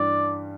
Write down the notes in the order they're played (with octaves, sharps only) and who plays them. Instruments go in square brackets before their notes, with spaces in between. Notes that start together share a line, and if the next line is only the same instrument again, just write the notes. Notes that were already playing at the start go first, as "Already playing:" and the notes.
Already playing: [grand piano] G2 E3 G3 D4 [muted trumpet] D5